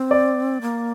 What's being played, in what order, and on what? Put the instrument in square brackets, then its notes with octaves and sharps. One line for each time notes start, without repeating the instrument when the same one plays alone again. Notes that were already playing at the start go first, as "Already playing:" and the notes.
Already playing: [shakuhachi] C4
[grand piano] D5
[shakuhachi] A#3